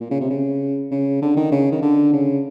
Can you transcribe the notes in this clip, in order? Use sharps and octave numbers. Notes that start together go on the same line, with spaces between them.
A#2
C#3
C3
C#3
C#3
D3
D#3
C#3
D#3
D3
C#3